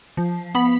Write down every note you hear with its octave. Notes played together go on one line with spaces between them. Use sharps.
F3
B3 B5